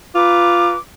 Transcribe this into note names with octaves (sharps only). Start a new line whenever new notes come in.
F4 B4 A#5 D6